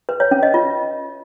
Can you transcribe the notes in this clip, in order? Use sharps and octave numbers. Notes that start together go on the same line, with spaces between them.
B4
C#5
C#4
D#5
F4